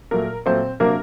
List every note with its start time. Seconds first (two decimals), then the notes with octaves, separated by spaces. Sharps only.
0.11 A#2 F#3 A3 A#4
0.46 A#2 F#3 A3 C4 C5
0.80 C3 F#3 A#3 D4 A#4